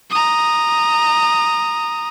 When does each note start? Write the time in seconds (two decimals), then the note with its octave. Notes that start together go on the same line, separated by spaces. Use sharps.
0.10 A#5 D#6